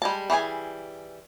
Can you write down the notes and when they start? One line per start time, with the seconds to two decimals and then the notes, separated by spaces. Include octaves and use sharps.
0.02 G3 G#3 A5
0.30 E3 G3 G#4 G#5